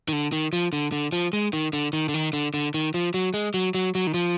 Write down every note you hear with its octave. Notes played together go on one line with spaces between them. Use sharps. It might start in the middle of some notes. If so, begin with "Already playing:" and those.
D#3
D3
D#3
F3
D3
D3
F3
G#3
D#3
D3
D#3
D3
D#3
D3
D3
D#3
F3
F#3
G#3
F#3
F#3
F#3
D#3
F3